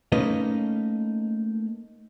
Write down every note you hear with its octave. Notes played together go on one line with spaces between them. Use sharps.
A3 A#3 C#4 D#4 B4 D#5